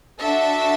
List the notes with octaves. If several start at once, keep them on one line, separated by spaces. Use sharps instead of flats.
D4 F#4 A4 E5